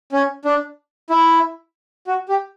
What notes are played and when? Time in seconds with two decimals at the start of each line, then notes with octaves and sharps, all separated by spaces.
0.12 C#4
0.45 D4
1.10 E4
2.07 F#4
2.29 G4